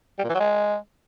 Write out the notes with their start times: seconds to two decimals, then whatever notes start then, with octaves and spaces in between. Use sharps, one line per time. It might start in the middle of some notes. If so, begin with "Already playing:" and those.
0.19 G3
0.24 A#2
0.29 E3
0.35 F#3
0.40 G#3